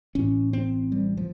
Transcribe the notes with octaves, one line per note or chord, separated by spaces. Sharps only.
A1 A2 C#4
C4
G3
F3